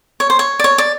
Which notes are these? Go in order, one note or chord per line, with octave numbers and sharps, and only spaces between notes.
C#5
C5
C#5
D5
C#5
D5